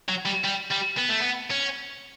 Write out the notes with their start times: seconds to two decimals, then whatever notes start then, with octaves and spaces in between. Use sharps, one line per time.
0.09 F#3
0.26 G3
0.44 G3
0.71 G3
0.98 B3
1.10 A3
1.21 B3
1.51 C#4